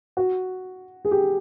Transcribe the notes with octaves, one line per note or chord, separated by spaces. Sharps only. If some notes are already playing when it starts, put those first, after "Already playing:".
F#4
G#4
G4